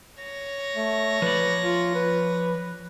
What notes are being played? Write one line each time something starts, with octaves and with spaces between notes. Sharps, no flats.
C#5 A#6
A3
F3 B4 D5
F4
B4